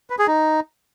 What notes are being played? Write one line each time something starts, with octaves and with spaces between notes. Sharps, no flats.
B4
G#4
D#4